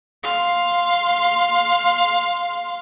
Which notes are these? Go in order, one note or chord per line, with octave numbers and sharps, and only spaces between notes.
F5 C6